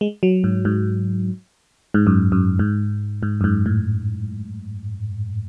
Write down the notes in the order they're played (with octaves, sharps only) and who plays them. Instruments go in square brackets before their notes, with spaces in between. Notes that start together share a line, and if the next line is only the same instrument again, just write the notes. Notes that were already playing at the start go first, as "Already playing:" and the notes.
[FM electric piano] G#3
F#3
G#2
G#2
G#2
F#2
F#2
G#2
G#2
F#2
G#2
A2